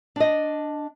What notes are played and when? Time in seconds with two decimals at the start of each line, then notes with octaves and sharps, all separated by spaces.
0.16 D4 D#5